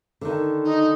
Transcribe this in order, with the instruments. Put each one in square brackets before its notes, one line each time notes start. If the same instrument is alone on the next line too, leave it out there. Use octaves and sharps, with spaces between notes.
[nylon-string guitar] D3 D#3
[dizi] D#4